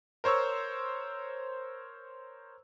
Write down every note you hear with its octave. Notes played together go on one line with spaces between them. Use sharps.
A#4 C5 C#5 C#6 E6